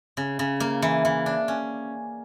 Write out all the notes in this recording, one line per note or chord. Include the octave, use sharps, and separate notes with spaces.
C#3
C#3
A#3
E3
E3
D4
C#4